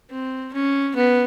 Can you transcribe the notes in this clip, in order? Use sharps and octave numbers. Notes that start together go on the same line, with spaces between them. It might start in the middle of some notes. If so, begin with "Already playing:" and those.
C4
C#4
B3